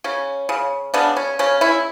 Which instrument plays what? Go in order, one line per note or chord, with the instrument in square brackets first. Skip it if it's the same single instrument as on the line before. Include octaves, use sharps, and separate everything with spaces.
[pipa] C#3 C#4
C#3
C#3 B3 D4
C#4
C#3 C#4
C#4 E4